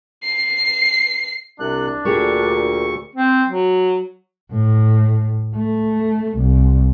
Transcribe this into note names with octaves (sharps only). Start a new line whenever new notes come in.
C7
C2 C3 D4 F#6
D2 A#2 A3 G4 G#4 C#6
C4
F#3
A2
A3
C2